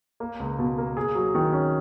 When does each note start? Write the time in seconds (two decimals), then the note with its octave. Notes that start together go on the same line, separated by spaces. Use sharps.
0.20 A#3
0.40 C#2
0.59 B2
0.78 A#3
0.97 G#4
1.15 F#3
1.35 D#3
1.53 C#4